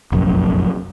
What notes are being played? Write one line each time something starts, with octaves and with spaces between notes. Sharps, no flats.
F1 A#1 F#2